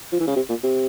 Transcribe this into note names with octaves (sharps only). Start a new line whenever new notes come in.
F3
E3
C#3
C3
A#2
C3